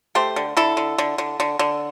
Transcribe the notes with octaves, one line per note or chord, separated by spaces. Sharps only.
A3 G4 C5
D3
D3 E4 A4
D3
D3
D3
D3
D3